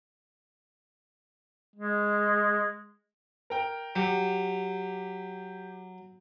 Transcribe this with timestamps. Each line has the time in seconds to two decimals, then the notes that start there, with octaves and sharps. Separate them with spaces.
1.75 G#3
3.50 A#4 G5
3.96 F#3 G4